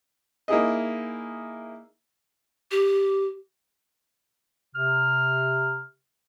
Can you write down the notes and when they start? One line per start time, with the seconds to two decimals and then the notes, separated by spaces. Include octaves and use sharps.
0.48 A#3 D#4 E4 G#4 D#5
2.71 G4
4.74 C3 F6